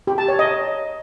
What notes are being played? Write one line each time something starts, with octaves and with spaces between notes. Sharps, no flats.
G4
A5
C#5
D#5